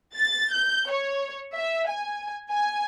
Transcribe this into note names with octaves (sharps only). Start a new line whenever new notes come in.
A6
G6
C#5
E5
G#5
G#5